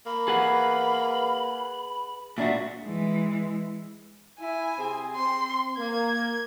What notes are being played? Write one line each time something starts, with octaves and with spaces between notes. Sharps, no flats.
A#3 B5
G#4 B4 F#5
A#2 D4 F#4 E5
E3 G#3
E4 G#5
C3 C4 G#4
C4 C6
A#3 G#6